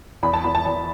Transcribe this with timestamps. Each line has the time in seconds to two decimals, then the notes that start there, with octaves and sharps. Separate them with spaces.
0.23 E2 B5
0.34 A5
0.44 E2 B5
0.55 A5
0.66 E2 A5